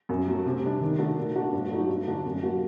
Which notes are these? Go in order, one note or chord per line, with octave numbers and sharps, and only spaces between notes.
F#2
F#3 A3
C3
G3 D4
D#3
A3 D4 F#4
A#2
A3 D4 F#4
G2
F#3 A3 D#4 F#4
G2
D3 A3 D4 F#4
F#2
F#3 A#3 F#4